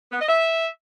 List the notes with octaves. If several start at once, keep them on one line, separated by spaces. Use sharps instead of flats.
B3
D#5
E5